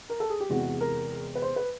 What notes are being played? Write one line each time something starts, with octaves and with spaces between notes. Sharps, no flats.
A#4
A4
G#4
G4
E2 C3 E3 G#3 F#4
A#4
B4
C5
B4